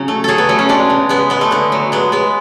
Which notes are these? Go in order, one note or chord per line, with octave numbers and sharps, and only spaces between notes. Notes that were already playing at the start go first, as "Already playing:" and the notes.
Already playing: C#3 F#3 C#5
A3
F#3 G#4 A4
B3
F#3 A3
C#4
G#3 D4
C#3
G#3 B3
G#3 B3
A3
D3 B3
F#3
G#3 B3
G#3 B3